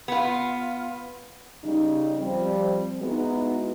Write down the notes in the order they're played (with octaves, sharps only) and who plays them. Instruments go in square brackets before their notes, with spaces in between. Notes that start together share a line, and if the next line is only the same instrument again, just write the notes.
[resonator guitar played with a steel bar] B3 F4
[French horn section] C#3 G3 C#4 D#4
F3 G3 C4
G#3 B3 D#4 E4 F#4